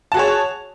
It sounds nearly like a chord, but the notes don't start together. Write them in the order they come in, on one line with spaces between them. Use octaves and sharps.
A5 F#4 G#4 C#5